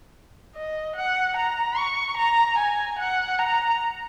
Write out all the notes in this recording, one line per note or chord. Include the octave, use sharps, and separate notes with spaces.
D#5
F#5
A#5
C#6
A#5
G#5
F#5
A#5